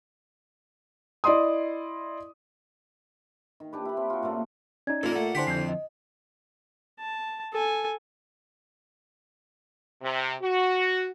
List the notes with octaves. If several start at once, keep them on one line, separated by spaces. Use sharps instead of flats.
E4 D5 D#5 C6 D#6
D#3
D4 G4 B4
E4 B5
C4
F4 F#4
A#2 C#3 A3 A#3
C#4 D#4 D5 G#6
A#2 A#3 A4 A#5
A3 A4 F#5
D3 D4 E4 G4 C5 G#5 C6 B6
F3 C4 G6 C7
D#5
A5
A4 G#5
C3
F#4